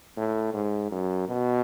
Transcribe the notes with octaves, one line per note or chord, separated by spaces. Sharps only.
A2
G#2
F#2
B2